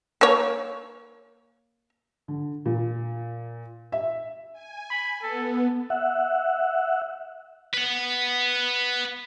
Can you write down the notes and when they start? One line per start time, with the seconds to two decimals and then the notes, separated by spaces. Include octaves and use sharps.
0.21 A#3 C#5
2.28 D3
2.66 A#2
3.92 E5
4.53 G#5
4.91 B5
5.22 B3 A4
5.90 E5 F#5
7.74 B4 F#5